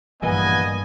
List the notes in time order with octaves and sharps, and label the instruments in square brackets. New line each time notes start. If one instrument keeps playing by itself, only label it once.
[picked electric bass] A#1 E3 A#3 [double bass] G2 [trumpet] B3 [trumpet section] D#5 G#5